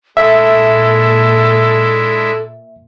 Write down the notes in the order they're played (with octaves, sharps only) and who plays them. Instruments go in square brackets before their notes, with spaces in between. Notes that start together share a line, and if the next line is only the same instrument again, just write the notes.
[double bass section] A#2 [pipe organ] G#3 D4 E4 [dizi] A4 [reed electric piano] E5